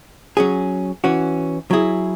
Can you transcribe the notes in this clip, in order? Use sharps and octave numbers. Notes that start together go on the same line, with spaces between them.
F#3 C#4 G#4
E3 C#4 F#4
F#3 E4 G#4